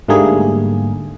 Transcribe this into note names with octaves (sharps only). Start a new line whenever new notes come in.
G#2 D3 G3 A3 A#3 G#4